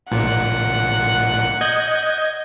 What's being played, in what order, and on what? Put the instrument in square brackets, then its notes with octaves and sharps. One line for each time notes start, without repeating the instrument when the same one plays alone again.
[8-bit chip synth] A#1 A#2 [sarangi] F#5
[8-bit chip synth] D#5 G6 G#6